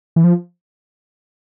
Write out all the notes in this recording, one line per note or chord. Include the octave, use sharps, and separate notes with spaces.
E3
F3